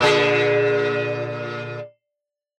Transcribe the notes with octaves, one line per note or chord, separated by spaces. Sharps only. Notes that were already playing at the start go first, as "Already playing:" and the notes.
A#2 D3 G#4